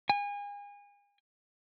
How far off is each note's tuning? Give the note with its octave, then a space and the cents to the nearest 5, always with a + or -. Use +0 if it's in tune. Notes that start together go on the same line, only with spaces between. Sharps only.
G#5 -35